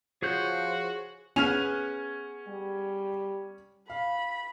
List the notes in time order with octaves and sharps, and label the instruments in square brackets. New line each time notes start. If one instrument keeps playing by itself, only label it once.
[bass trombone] F3 [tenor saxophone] F#4 [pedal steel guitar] G#4 C#5 G6 [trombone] C5
[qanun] B3 G#4 B4 [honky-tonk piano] C#4 F7 [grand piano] G#5 F6 D#7
[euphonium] G3
[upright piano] F5 [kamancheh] B5